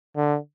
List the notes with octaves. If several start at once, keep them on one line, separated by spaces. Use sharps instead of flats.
D3